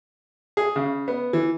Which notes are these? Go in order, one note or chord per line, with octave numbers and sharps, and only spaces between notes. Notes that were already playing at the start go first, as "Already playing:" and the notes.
G#4
C#3
B3
E3